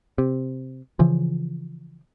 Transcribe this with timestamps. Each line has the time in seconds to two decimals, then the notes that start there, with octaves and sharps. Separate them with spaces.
0.18 C3
0.99 C#3 E3 F3